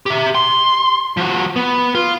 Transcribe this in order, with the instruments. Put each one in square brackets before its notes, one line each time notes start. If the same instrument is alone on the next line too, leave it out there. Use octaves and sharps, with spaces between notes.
[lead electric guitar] G4 E5
C6
F3 F#4
B3
F4